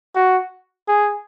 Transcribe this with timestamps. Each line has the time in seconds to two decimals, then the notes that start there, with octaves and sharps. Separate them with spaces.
0.15 F#4
0.88 G#4